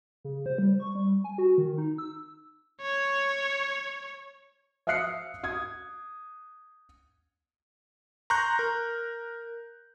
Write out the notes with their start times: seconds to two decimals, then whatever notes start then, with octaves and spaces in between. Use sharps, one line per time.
0.24 C#3
0.46 C5
0.58 G3
0.80 C#6
0.95 G3
1.24 G#5
1.38 F#4
1.58 D#3
1.78 D#4
1.98 E6
2.82 C#5
4.87 E5 F5 D#6 F#6 C7 C#7
5.44 D#6 G#6
8.30 A#5 C6 C#6 F#6 G6 A#6
8.59 A#4